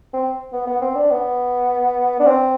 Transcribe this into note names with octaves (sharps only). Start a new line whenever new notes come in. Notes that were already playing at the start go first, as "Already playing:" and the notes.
C4
B3
B3
C4
D4
B3
D4
C4